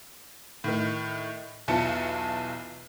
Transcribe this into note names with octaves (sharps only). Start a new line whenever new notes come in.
A2 D#3
B1 E2 E4 F4 A5 C#7